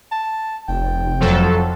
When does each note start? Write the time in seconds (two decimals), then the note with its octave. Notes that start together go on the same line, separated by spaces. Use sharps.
0.12 A5
0.68 F1 G5
1.20 F2 F3 F#3 A4